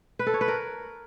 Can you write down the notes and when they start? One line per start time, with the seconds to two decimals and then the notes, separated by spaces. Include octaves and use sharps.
0.19 B4
0.27 A4
0.34 C#5
0.41 B4
0.48 A#4